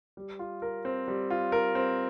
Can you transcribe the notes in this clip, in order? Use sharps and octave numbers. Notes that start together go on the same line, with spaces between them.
G3
F4
A#4
C4
G3
F4
A#4
C4